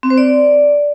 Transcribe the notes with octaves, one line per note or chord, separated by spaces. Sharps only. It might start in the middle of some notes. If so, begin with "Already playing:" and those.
C4
C5
D5